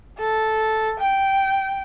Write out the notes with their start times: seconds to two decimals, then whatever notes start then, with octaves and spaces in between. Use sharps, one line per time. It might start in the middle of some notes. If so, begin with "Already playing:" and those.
0.18 A4
1.00 G5